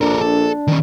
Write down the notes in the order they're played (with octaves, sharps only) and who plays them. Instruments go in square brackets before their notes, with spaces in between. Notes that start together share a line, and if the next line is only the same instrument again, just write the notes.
[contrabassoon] A#1 [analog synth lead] D4 [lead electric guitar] A4 A#4
[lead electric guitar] A4
D#3 C#4